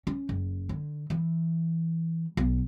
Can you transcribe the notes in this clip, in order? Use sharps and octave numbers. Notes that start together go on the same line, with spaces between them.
C#4
F#1
D3
E3
B1